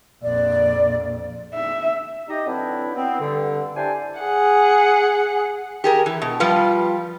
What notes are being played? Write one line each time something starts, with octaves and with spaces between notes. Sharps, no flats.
A#1 F2 D5
E5
D#4 G4 D#5
D3 E3 F#3 C4 D4 E4
B3 C4
G2 D3
D4 E4 G4 C5 D5 G#5
G#4 F#5
G4 G#4 A#4
E3
B2
F3 G3 F4 B4